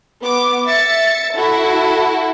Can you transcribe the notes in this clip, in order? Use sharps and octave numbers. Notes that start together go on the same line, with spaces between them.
B3 D6
E5 A6 C#7
E4 F#4 A4